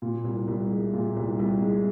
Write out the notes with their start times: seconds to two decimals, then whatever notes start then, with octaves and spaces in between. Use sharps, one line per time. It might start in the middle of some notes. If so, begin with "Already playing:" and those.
0.02 A#2
0.24 C2
0.47 C2
0.70 G#3
0.94 A#2
1.16 C2
1.39 C2
1.62 G#3